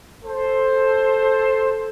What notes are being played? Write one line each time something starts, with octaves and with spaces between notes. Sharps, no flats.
A4 C5